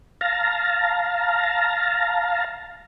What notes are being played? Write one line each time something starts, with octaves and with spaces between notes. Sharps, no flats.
F5 A5 A#5